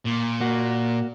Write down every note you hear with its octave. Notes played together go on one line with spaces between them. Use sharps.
A#2
A#3 F#4